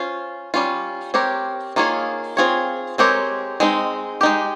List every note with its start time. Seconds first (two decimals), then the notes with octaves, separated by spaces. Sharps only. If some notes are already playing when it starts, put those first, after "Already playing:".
Already playing: C#4 F4 C5
0.54 G3 C#4 F4
1.14 C4 G4 A#4 C#5
1.76 D#3 A#3 F4 G#4 C#5
2.37 C4 F4 G#4 C#5
2.98 G#3 C4 G4 A#4 C#5
3.60 G#3 C4 D#4
4.21 G#3 D#4 G4